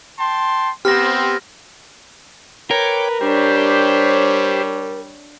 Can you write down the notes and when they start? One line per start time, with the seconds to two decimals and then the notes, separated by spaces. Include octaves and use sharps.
0.19 G5 A5 C6
0.85 B3 C4 G4 F6 A#6
2.71 A#4 B4 C#5 G5 D6
3.21 G3 D4 G4 C5 C#5